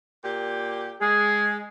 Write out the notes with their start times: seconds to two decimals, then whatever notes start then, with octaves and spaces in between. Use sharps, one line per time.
0.24 A#2 G4
1.01 G#3 G#4